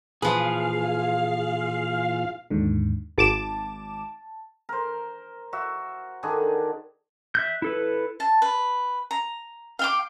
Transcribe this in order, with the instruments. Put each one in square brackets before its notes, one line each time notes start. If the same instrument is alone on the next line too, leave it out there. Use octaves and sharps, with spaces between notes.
[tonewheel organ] A#2 E3 F4 [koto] F3 B4 [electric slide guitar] G#4 [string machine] F5
[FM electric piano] D#2 G#2 D3
[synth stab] G#1 D6 E7 [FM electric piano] A5
[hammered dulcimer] A#4 C5
F#4 E5
D3 D#3 D4 G#4
[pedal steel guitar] E5 F#6 G6
E4 A4 B4
[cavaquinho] A5
B4
A#5
F5 G5 D6